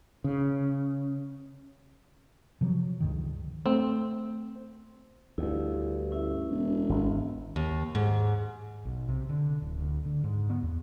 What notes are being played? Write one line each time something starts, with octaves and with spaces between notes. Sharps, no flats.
C#3
C3 F3 F#3
C#2 G2 D#3
A3 C4
D2 G2 E4
C#4 E4 E5
E1
G#1
D#2
G#2
B1
C3
D3
D1
D2
D3
G#2
B3
E2